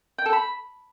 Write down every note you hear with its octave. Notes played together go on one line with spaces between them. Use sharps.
G5
A4
B5